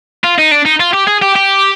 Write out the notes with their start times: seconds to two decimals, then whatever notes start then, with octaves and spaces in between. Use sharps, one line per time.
0.24 F4
0.38 D#4
0.51 D4
0.65 D#4
0.80 F4
0.93 G4
1.07 G#4
1.22 G4
1.35 G4